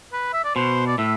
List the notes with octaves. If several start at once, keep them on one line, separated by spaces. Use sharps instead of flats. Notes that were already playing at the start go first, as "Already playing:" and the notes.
B4
E5
D5
B2 C5
D5
A2 E5